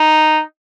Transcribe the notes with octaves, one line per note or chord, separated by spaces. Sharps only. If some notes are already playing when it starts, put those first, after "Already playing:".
Already playing: D#4